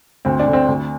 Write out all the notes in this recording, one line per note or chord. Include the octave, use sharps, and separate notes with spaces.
D2 C4
D4
D3
C4
D2